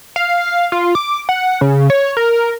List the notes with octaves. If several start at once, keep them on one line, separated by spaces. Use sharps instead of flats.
F5
F4
D6
F#5
C#3
C#5
A#4